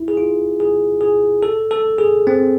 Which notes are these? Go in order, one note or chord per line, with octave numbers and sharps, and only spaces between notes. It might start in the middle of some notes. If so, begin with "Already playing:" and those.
Already playing: E4
G#4
F4
G#4
G#4
A4
A4
G#4
C4